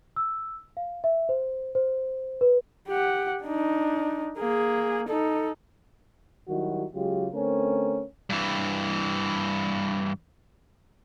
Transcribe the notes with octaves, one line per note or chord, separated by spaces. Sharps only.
E6
F5
E5
C5
C5
B4
G4 F#5
D4 D#4
A#3 G#4
D#4 A4
D#3 F#3 G3 E4 F#4
C#3 F#3 G#3 F4 G4
D3 A3 C4 C#4 A#4
G2 E3